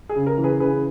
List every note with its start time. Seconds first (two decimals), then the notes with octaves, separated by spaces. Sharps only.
0.09 G#4
0.16 C#3
0.26 A#4
0.38 E3
0.44 G#4 B4
0.60 C#3 G#4 B4